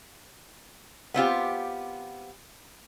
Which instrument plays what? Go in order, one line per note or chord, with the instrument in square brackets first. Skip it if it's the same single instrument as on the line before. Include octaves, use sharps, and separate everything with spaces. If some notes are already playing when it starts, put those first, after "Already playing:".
[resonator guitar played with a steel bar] B3 C4 F4 G4